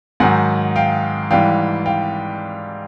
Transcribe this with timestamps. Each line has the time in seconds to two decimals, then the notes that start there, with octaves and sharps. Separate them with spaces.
0.20 G#2 D#3 F#3 F#5 G#5
0.76 F5 G5
1.31 G#2 E3 G3 F5 G5
1.86 F5 G5